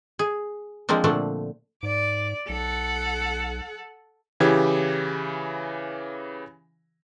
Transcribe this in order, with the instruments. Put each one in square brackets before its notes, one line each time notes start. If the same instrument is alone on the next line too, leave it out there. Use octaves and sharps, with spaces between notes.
[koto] G#4
F3 G#3 A#3 C4 D4
A#2 D3 F3 A3 D4
[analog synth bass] G#2 [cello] D5
[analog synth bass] B1 [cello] A4 F#5
[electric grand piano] C#3 E3 G4 G#6